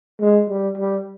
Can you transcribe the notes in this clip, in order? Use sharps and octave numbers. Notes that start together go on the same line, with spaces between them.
G#3
G3
G3